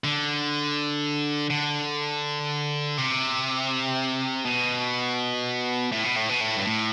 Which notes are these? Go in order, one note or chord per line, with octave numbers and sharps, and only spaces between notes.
D3
D3
C3
B2
A2
B2
A2
B2
A2
G2
A2